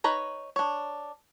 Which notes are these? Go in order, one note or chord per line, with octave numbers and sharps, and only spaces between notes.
D#4 B4 C#5 A#5
D4 C#5